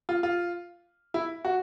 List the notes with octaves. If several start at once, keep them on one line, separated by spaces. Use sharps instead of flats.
F4
F4
E4
F#4